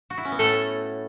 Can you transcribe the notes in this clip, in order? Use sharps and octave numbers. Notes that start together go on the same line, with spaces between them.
F#4
E4
C#4
B3
A2 A3 A4